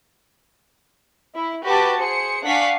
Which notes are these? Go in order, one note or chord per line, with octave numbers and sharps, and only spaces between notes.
E4
F#4 G4 B4 A5 D6
G#4 C5 C#7
D4 F5 F#5 G#5 C#6 B6